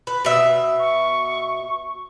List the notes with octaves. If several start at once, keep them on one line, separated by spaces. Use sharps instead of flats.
B4
B2 E5
C#6